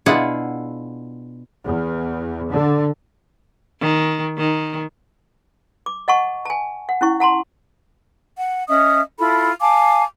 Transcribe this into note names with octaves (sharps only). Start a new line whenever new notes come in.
B2 D4 E4 F4 G#4 F#5
E2
D3
D#3
D#3
D6
D#5 F#5 A5 C#6
G#5 A5
F#5
C#4 E4 C#6
F#5 A5 A#5 C6
F#5
C#4 D#5 E5 D#6
E4 F4 A4 B5
F5 G#5 A5 D6